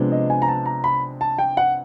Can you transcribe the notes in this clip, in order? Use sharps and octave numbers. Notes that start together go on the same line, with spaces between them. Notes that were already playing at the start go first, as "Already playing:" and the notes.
Already playing: C3 F3 G#3 B3 D4
D#5
G#5
A#5
A5
A#5
B5
A5
G5
F#5